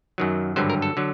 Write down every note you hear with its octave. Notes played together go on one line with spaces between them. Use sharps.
F#2 D#3 F#3
G#1 G2 D3 F#3 C5
A#4
A4
D3 F#3